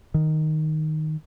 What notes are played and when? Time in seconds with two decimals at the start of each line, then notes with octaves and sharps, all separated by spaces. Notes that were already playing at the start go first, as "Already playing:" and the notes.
0.14 D#3